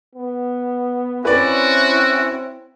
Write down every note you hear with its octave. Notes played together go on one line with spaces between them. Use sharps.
B3
C4 C#4 E4 F#4 B4 D5